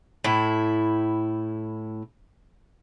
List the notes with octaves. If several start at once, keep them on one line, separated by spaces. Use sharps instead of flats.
A2 E4